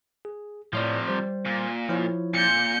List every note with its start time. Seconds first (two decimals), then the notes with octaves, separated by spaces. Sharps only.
0.25 G#4
0.73 A2 C3 F3 C#5 D5
1.08 G3 C5
1.45 A#2
1.89 F3 E4 C#5
2.34 A#2 G6 C#7